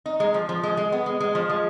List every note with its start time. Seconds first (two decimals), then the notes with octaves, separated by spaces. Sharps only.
0.06 D#4
0.20 G#3
0.34 F3
0.49 F3
0.63 G#3
0.77 G#3
0.92 B3
1.06 G#3
1.20 G#3
1.35 F3
1.49 G#3